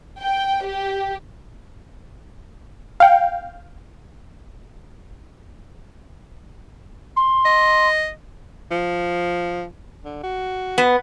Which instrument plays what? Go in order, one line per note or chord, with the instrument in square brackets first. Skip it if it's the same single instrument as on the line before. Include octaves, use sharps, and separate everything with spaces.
[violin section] G5
G4
[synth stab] F5 G5
[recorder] C6
[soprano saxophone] D#5
[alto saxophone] F3
D3
F#4
[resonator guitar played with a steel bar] B3